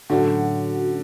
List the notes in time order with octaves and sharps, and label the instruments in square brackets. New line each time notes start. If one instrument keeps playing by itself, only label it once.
[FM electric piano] A2 F#3 A3 C#4 F#4 [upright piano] D3